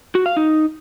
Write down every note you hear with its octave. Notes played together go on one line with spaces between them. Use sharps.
F#4
F5
D#4